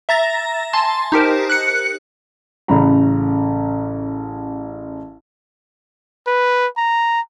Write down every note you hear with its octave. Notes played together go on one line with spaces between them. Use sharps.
E5 A#5 A6 A#6
G#5 A5 C6
D#4 G4 A#4 C5
F#6 C#7
A1 C#3 A#5 B5
B4
A#5